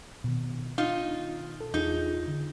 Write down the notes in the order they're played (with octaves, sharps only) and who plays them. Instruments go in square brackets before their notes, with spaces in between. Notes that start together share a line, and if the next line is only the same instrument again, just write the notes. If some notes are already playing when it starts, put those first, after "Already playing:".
[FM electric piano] B2 D#3
[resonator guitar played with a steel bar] D#4 F4
[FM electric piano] A4
[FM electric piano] E2 F4 G#4 [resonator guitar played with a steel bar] D#4
[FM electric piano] D3